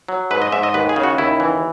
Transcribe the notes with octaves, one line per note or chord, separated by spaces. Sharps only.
F#3
G#2 B4
D#5
G#2 E5
D#5
D#2 B4
G#4
C#3
F#4
D#2 E4
E3